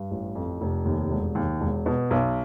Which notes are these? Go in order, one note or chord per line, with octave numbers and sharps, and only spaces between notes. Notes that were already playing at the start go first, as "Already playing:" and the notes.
Already playing: G2
A1
F2
F1
D#2
E1
D#2
E1
B2
B1